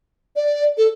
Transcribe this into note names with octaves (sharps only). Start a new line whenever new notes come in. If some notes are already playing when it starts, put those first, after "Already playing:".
D5
A4